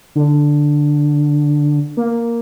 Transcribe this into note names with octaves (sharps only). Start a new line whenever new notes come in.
D3
A#3